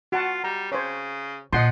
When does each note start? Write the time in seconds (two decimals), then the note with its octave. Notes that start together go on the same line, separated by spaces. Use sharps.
0.12 F4 F#4 F#5 A5
0.44 G3 A#5
0.72 C#3 C5 C#5
1.53 A#2 F3 D#5 F#5 C6